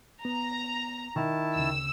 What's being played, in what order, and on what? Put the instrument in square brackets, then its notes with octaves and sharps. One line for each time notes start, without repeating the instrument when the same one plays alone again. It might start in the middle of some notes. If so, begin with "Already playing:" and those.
[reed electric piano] B3 [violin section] A#5
[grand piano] D#3 [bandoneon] E4 A5
[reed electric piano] D2 C#3 [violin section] E6